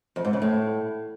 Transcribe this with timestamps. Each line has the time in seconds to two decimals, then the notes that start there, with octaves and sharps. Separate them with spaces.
0.16 F2
0.25 G#2
0.33 C#3
0.42 A2